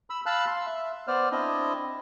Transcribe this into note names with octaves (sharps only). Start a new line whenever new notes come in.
B5 E6
F5 A5 B5 E6 F#6
C6
E5
B3 C5 D5 F6
C4 D4 E4 D#5